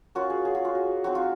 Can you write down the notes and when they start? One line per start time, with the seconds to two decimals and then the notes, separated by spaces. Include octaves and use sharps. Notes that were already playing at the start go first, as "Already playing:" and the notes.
0.15 A#3 C#4 F4 F#4
0.30 G#4
0.45 G#4
0.55 F#4
0.65 F4
0.75 F#4
1.04 F#3 C4 D#4 F#4
1.15 F4